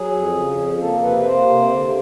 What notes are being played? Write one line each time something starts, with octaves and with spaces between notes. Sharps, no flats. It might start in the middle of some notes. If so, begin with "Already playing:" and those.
Already playing: F#3 G#4
F2
C#3
F2
A#3 A4
C3 B4
B4
A#3 C5
C3
D3